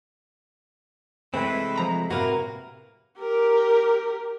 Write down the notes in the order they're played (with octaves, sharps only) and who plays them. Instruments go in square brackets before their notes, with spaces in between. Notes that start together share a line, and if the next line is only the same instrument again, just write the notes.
[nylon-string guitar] C3 [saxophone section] E3 B4 [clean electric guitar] G#3 A3 C4
[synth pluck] F3 A#5 B5
[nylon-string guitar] A2 C3 [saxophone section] A#3 A#4 [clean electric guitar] F#4 B4
[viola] G4 A#4